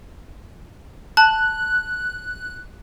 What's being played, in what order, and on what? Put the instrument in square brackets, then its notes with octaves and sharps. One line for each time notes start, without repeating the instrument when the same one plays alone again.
[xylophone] A5 [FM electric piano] F#6